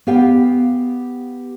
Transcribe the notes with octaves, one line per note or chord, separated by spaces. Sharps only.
B3 G4 F5 G5